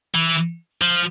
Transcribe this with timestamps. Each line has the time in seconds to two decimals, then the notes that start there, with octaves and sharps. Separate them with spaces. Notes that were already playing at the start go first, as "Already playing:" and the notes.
0.15 E3
0.82 F3